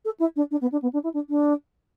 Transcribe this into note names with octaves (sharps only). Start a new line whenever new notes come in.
A4
E4
D4
D4
B3
D4
B3
D4
E4
D4
D4